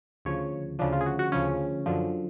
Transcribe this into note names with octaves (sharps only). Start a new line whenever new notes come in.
D2 C#3 F3 C#5
D2 C#3 F3 D4
F4
G#4
F#4
F#4
D2 C#3 F3 C#4
F#2 D3 F3